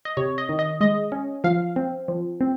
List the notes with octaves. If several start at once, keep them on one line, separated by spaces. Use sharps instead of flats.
D#5
C3 C#5
D#5
D#3
D#5
G#3 D#5
C#4
F3 F5
C4
F3
C4